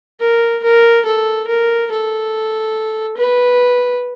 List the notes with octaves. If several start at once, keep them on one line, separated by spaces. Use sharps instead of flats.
A#4
A#4
A4
A#4
A4
B4